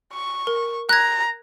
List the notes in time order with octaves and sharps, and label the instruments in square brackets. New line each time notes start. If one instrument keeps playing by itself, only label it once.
[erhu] C#6
[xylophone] A#4
[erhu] A#5 [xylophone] F#6 G#6